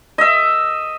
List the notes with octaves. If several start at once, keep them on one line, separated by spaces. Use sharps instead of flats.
D#5 E5